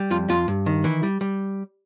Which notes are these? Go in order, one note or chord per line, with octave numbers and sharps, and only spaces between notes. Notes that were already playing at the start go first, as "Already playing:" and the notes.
Already playing: G3
F2 F4
F2 F4
G2
D#3
E3 E4
G3
G3